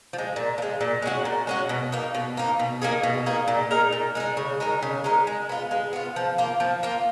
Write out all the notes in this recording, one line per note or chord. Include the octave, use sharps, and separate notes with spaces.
F3
G#3
A#2
F3
G#3
A#2
G#3 C#4 F#4
A#2
G#3 C#4 F#4
B2
A#3 D#4
B2
A#3 D#4
B2
A#3 D#4 G#4
B2
A#3 D#4 G#4
A#2
G#3 D#4 A#4
A#2
G#3 D#4 A#4
C#3
G#3 D#4 A#4
C#3
G#3 D#4 A#4
G#3
B3 F4
G#3
B3 F4
F3
A#3 F4
F3
A#3 F4